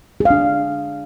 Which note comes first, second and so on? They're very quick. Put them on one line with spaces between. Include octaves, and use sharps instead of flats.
G#4 F5 D4